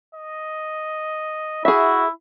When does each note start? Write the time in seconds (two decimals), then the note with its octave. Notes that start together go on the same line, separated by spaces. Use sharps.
0.15 D#5
1.65 E4 F#4 G#4 E5